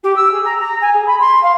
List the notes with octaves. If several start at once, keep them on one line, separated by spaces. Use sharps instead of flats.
G4
E6
G#4
A#5
A#5
G#5
G#4
B5
C6
F5